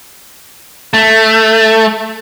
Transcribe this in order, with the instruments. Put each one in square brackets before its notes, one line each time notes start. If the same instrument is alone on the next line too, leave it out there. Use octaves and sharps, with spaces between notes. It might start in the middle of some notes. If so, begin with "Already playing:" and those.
[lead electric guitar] A3